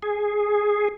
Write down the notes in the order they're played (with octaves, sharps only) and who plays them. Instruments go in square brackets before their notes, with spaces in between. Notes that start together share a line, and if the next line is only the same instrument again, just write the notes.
[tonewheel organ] G#4